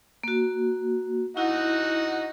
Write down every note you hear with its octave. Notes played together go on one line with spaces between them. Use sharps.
A#3 F#4
D#4 E4 F#4 F#5